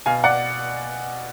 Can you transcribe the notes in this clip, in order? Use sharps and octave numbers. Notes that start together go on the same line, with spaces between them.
B2 F5 G#5
D5 F#5